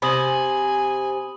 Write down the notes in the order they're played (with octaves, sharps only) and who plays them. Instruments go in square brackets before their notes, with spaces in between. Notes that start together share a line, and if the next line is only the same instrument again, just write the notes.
[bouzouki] C3 [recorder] G#5 [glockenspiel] B5 D#6 F#7